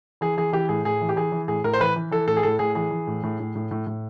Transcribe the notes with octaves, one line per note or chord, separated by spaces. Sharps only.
E3 G#4
E3 G#4
E3 G4
A2 G#4
A2 G#4
E3
G4
E3 G#4
E3
A2 G#4
A2 A#4
C5
E3 B4
E3
E3 A4
A2 A4
G#4
A2 A4
A2 G#4
E3 G#4
E3
A2
A2
A2
A2
A2
A2